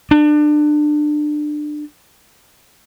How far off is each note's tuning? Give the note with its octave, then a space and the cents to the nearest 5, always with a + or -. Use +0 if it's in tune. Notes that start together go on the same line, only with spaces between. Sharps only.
D4 +25